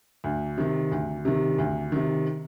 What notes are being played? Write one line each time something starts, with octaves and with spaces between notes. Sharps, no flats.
D2
C3 D#3
D2
C3 D#3
D2
C3 D#3